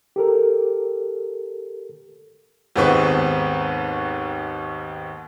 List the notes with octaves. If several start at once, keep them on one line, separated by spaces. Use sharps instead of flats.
G4 A4 A#4
D#2 G#2 B3 C4 B4 C#6